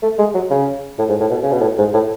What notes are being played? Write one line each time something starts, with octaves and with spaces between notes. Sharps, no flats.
A3
G#3
F#3
C#3
A2
G#2
A2
B2
C#3
B2
A2
G#2
A2